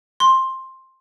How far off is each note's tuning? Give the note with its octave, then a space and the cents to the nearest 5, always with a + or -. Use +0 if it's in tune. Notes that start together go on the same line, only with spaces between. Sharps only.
C6 +10